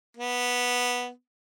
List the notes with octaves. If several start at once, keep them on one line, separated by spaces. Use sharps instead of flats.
B3